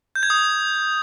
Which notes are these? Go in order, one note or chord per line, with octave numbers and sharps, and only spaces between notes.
G6
G#6
D#6